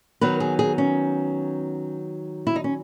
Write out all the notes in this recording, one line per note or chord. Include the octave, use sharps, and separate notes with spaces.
D#3 F#3 B3 B4
G#4
G#4
C#4
E4
D#4
C#4